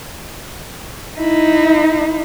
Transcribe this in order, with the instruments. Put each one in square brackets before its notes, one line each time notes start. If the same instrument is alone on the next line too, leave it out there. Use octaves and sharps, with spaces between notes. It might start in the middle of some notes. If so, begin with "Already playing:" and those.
[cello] D#4 E4